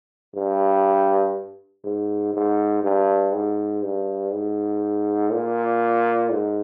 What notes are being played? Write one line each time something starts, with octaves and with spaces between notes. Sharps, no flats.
G2
G#2
G#2
G2
G#2
G2
G#2
A#2
G#2